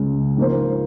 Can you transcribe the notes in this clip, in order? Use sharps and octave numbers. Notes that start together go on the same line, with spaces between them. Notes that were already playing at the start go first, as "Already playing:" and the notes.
Already playing: C#2 C#3 G#3
G#2 F3 A#3 F4 C5